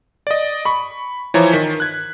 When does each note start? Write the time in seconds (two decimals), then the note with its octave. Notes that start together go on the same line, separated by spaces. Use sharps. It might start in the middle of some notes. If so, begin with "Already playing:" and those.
0.27 D5 D#5
0.65 B5 C#6
1.34 E3 F3 C#5 A#5
1.53 D#3 B6
1.80 F#6 G#6